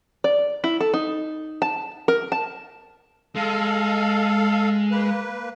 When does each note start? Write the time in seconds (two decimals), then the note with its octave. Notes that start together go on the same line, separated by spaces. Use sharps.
0.24 D5
0.64 E4
0.81 A4
0.94 D#4
1.62 A5
2.08 A#4
2.32 A5
3.36 G#3 A4 F5
4.91 A#3 B4